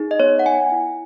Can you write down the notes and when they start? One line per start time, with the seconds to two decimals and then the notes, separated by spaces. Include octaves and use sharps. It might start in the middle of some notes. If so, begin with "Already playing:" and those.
Already playing: D#4 G#4
0.11 D#5
0.19 B3 C#5
0.39 F#5
0.46 B3 G#5
0.72 E4